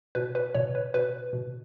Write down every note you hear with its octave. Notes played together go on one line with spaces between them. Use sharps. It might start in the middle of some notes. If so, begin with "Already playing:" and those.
B2 B4
B4
B2 C#5
B4
B2 B4
B2